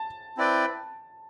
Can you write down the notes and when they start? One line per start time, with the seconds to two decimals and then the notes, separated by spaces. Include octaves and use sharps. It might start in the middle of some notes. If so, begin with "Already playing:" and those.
Already playing: A5
0.37 C4 E4 B4 D5 G5